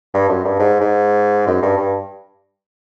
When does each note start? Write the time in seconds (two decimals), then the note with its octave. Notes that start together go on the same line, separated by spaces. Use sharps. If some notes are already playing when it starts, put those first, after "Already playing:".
0.14 G2
0.29 F#2
0.45 G2
0.59 G#2
0.81 G#2
1.47 F#2
1.62 G2
1.77 G2